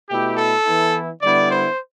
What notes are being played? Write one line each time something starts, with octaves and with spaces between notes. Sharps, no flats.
B2 A3 E4 G4
A4
E3 B3 E4
D3 G3 B3 E4 D5
C5